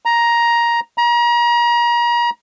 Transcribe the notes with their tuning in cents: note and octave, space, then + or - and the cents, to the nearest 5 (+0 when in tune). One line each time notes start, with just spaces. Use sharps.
A#5 +10
A#5 +35